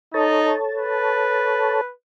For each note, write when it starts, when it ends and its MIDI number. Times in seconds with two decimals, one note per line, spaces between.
0.14 0.55 63
0.14 1.81 69
0.14 1.81 73
0.14 1.81 81
0.77 1.92 71